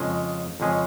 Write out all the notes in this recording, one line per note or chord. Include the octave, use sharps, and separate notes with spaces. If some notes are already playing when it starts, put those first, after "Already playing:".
Already playing: F2 C#3 G#3 C#4 G#4
F2 C#3 G#3 C#4 G#4